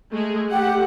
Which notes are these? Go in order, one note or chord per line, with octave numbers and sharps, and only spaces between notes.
G#3 A3 G#4
A3 G4 F#5